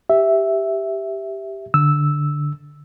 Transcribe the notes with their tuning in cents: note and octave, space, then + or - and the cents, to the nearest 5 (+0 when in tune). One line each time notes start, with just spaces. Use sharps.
G4 +0 E5 +0
D3 +0 E6 -5